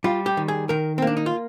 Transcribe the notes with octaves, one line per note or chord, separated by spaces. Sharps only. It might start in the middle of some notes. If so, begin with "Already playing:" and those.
G3 F4
G4
D#3
G#4
D#3 A#4
C4
A#3 D4
D#4
F4